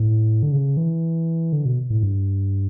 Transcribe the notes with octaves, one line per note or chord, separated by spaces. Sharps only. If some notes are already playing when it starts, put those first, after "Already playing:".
Already playing: A2
D3
C#3
E3
D3
B2
A2
G2